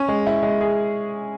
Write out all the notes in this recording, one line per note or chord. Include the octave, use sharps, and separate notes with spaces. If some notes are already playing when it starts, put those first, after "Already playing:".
Already playing: C#4
G#3
E4
G#3
G#4